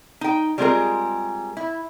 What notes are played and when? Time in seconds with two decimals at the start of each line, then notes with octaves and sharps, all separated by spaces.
0.21 D#4 G5
0.58 G3 G#3 C4 F4 G#4 A#4
1.57 E4